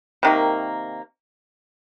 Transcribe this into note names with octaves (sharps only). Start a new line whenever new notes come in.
C3 D#3 A#3